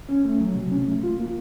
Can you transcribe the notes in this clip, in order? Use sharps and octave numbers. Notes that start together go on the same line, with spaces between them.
C#4
A3
F#3
C3
C#4
A3
F4
A#3